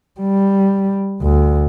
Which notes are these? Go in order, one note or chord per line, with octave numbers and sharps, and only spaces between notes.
G3
D2